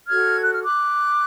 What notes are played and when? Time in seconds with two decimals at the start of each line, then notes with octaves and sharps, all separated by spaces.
0.08 F#4 A4 C#5 F6 G#6
0.42 F#6
0.53 F6
0.63 D6 F#6